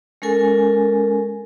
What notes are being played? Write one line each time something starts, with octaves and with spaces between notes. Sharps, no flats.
G#3 C#4 A4 A#4 G#5